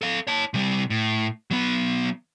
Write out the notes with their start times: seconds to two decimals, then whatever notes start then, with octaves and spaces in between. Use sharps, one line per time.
0.01 A4 F5
0.27 C#5 A5
0.54 C3 G3
0.90 A2
1.51 F#3 B3